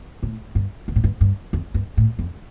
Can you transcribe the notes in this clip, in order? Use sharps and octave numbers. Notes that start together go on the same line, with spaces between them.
A2
G2
G2
A2
G2
G2
F2
G2
A2
F2